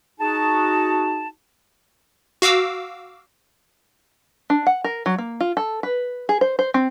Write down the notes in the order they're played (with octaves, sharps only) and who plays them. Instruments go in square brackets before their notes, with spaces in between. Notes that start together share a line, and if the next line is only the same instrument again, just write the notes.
[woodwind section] D#4 F#4 G#4 A5
[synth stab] F#4 F5 D6 E6
[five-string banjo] D4
F#5
A#4
F#3
A#3
F4
A4
B4
G#4
C5
C5
C4